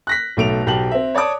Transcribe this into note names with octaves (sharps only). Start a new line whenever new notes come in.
F#6 A#6 B6
B1 A3 D7 F7
B1 G4 A5 F#7
C4 E5
C#5 D5 A5 D6 D#6